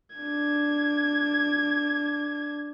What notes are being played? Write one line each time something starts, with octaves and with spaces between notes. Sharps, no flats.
D4 G#6